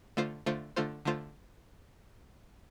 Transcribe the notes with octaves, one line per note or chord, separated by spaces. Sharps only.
D3 A3 F4 C5
D3 A3 F4 C5
D3 A3 F4 C5
D3 A3 F4 C5